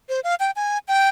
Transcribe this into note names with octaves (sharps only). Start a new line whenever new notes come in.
C5
F5
G5
G#5
G5